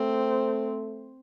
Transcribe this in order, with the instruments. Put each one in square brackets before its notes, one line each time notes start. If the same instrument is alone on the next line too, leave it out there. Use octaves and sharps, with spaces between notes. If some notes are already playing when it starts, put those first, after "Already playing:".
Already playing: [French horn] A3 [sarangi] C4